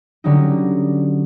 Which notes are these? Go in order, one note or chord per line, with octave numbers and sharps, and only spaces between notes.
D3 F#3 G3 C#4 D#4